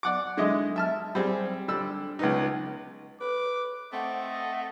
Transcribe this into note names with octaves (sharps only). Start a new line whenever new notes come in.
D5 F#5 D6
D3 G#3 E4 D#5
E5 A5 F6
G3 C4 G#4
D3 G3 D4 E6
C#2 B3 D#4
B4 D6
A3 C4 D#5 F#5